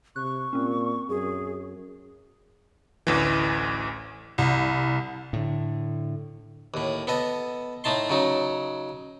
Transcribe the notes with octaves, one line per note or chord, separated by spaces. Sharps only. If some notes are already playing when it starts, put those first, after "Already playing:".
C3 C#6 F#6
A#2 C4 C#4
F#2 G#4
A1 D2 E3
C2
A2 D3
D#2 A2
B3 A4 D#5
A2 A3 D#4 A5 C6
C#3 F#3 D#4